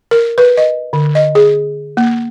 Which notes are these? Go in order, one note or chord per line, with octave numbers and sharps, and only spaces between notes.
A#4
B4
D#5
D3
D#5
G#4
A#3